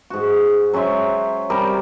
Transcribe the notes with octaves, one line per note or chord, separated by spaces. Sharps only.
G#2 F#4
F#3 C#4 C5 E5
C3 G3 A#4